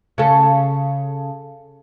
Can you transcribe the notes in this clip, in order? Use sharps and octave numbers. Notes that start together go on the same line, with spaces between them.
C#3 A4